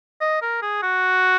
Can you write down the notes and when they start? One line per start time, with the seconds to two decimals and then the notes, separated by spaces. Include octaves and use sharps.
0.21 D#5
0.42 A#4
0.62 G#4
0.82 F#4